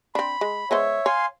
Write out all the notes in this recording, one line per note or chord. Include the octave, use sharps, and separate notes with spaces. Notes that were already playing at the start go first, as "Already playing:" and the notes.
C4 D4 B5
G#3
G#3 B3 C5 C#5 E5
C#5 F5 G#5 C6